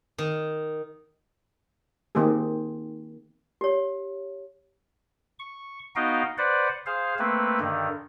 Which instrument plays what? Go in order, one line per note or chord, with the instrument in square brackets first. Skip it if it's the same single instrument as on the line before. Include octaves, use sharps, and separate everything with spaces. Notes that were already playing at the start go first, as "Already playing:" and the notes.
[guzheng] D#3
[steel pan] D#3 A#3 C4 G4 G#4
[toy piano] G4 C#5
[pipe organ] C#6
B3 D#4 F#4 D#5 F5 G5
B4 C5 D5 F#5
G#4 C5 F5
A3 A#3 C4 B4
G2 D3 D#3